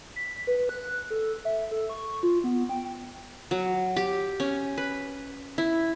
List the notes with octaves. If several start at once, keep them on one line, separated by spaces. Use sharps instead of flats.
B6
B4
F#6
A4
E5
A4
C#6
F4
B3
G5
F#3
G4
C#4
B4
E4